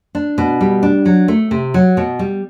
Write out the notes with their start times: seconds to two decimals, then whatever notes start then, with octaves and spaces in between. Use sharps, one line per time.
0.15 D4
0.38 B2
0.61 G3
0.83 D4
1.06 F#3
1.28 A3
1.51 C3
1.74 F#3
1.97 B2
2.19 G3